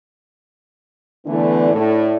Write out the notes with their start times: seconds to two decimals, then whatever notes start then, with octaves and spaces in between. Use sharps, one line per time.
1.27 D3 E3 A3 B3 D4
1.70 A2 A3 D4